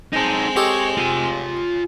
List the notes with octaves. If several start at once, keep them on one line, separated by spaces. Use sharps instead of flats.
G#3 C4 D#4 A4
G4 A4 C#5 D#5
F4 G#5